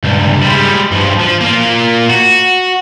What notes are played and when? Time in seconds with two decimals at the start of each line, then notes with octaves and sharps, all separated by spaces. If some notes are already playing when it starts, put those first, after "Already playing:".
0.04 C#2 G2
0.42 G3 G#3
0.92 G2 F3
1.20 F3
1.41 A#3 F4
2.09 F#4